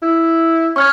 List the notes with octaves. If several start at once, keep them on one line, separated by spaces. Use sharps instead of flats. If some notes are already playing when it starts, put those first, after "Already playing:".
E4
C#4 C#6 F6 G#6